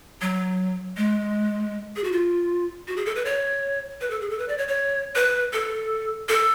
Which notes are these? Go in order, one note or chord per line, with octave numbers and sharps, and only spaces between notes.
F#3
G#3
G#4
F#4
F4
F#4
G#4
A4
B4
C#5
B4
A4
G#4
A4
B4
D5
C#5
C#5
B4
A4
A4